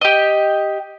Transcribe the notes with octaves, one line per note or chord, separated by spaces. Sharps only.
G4 D#5